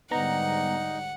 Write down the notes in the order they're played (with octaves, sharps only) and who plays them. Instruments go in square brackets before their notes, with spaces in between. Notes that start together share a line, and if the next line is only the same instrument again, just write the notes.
[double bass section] G#2 D3 G3 [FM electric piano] B3 A#5 [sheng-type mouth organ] D#4 [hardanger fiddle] F#5